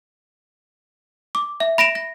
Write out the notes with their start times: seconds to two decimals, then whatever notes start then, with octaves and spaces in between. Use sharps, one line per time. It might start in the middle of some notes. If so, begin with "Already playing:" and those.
1.35 D6
1.60 E5
1.78 B5 A#6 D7 E7
1.95 A#6